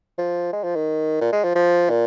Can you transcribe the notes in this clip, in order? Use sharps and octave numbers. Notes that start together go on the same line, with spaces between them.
F3
G#3
F3
D#3
A#2
G#3
F3
F3
A#2